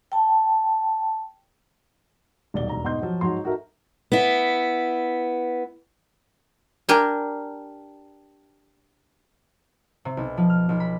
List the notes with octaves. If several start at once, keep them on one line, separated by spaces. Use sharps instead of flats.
G5 A5
D#1 B1 D5 G7
E1 A#5
G#2 B2 D#5 C6 G6
F3 F#3
G#2 F#3 C6
D#4 F#4 A4 A#4 E5
B3 E4
D4 G4 A#4 G#5
C3
B1
F3
F6
B1
B5